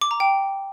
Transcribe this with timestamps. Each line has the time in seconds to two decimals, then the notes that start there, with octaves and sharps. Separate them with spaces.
0.02 D6
0.11 A#5
0.20 G5